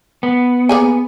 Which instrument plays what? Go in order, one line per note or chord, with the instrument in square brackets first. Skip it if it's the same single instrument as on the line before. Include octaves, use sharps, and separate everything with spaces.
[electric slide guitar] B3
[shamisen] A#3 G#4 G#5